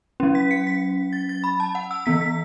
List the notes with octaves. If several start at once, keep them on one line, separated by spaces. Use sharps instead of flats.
F#3 C#4
B6
C#7
B6
A6
A6
B5
A5
F#5
E6
E3 B3 B6
B6